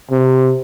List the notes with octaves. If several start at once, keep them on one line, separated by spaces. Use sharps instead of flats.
C3